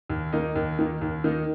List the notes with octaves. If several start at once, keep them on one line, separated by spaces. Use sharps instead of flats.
D#2
D#3 A#3 D#4
D#2
D#3 A#3 D#4
D#2
D#3 A#3 D#4